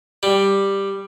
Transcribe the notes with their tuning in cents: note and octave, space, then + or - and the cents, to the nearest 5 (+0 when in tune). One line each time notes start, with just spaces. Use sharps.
G3 +5